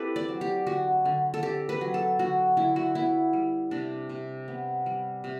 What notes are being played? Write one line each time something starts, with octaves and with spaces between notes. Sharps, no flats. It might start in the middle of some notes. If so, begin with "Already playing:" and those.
Already playing: C4 E4 G4 A4 B4
D5
F#3
G4
D3 F#4
D3
A4
C4 G4
B4
F#3
A4
D3 F#4
D3 E4
F#4
B3 E4
G3
C3 D4
C3
B3
G3
C3